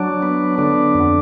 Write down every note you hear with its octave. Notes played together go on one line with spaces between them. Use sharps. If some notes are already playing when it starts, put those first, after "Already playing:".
Already playing: F#3 D4
B3
D3 D4
F2